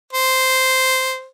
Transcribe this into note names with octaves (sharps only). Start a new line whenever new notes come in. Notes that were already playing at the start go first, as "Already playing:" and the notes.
C5